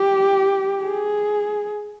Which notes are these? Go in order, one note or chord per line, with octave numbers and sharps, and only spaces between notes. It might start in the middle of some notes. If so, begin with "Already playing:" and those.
Already playing: G4
G#4